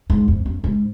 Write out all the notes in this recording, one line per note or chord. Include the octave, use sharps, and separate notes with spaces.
G#2
F2
F#2
G#2